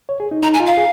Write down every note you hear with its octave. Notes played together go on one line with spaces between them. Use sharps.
C#5
G#4
D#4
D#4 A#5
G#5
F4
F5
G#4